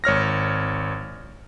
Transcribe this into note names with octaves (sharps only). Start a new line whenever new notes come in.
G#1 C#5 F6 A#6